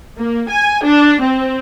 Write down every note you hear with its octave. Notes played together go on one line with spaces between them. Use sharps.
A#3
G#5
D4
C4